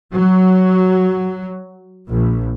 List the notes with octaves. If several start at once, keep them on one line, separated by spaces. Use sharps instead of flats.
F#3
A#1